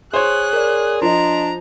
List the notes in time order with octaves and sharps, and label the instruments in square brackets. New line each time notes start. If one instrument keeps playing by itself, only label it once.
[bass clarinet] G#4 [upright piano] C5 C#5 [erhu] F#6
[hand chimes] A#4 D5
[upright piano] F3 [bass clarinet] D4 [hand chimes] D#5 C6 [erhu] A#5